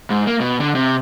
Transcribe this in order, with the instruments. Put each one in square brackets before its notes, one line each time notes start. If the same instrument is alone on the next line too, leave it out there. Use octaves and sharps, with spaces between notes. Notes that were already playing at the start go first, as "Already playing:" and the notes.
[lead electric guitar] G#2
A#3
B2
D3
C3